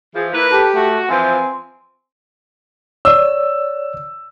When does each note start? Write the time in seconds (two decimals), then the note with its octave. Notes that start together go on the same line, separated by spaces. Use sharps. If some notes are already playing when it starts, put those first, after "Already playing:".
0.14 E3 F3 G#4
0.32 A#3 E4 B4
0.51 G4 A4
0.75 A3 F#4
1.09 E3 F3 C4 G#5
3.05 C#5 D5 E6